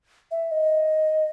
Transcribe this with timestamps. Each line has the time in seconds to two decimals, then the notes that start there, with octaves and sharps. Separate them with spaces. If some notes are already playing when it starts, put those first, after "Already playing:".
0.31 E5
0.51 D#5